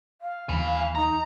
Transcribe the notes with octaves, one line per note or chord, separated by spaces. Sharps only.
F5
D#2 E3 G#5 B5
D#4 A#5